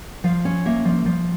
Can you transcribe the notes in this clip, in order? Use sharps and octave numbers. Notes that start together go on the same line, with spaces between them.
F3 F5
C#4
A#3 E5
F3
F3